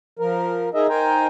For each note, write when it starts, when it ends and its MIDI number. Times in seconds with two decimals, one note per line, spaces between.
0.19 0.69 53
0.19 0.69 70
0.74 0.87 63
0.74 0.87 68
0.74 0.87 70
0.74 0.87 75
0.74 0.87 76
0.89 1.27 63
0.89 1.27 70
0.89 1.27 72
0.89 1.27 79
0.89 1.27 80
0.89 1.27 82